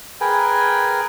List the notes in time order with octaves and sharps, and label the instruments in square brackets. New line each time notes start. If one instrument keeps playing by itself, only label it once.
[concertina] G#4 A#4 B4 G5 G#5